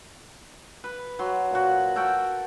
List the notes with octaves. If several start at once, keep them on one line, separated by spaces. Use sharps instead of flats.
B4
F#3 C6
A#2 F#4
F#4 A4 A#4 G5